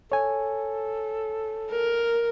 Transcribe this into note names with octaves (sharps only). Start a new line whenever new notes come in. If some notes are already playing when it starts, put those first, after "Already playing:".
A4 C#5 G#5
A#4